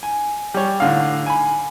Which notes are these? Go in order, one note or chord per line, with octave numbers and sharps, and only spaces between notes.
G#5
G3 C#5
A2 D3 F5
G#5 B5